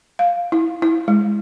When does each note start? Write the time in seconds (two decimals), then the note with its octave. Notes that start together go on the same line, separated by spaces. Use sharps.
0.19 F5
0.52 E4
0.82 E4
1.08 G#3